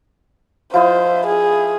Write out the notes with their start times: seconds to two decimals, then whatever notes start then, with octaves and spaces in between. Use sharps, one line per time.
0.74 F3 E4 C5 D#5
1.27 G#4